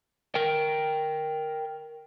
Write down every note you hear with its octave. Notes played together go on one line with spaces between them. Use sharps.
A#4 G5